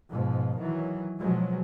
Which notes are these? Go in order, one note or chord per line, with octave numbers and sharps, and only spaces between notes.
G#2 B2 F3
D#3 E3 F#3
B2 F3 F#3 G#3